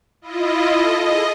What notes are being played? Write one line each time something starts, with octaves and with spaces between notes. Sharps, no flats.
E4 F4 D#5
A4 D#5
G#4 D#5